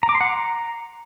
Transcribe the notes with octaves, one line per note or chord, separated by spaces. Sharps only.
A#5
D6
C6
F#5
A#5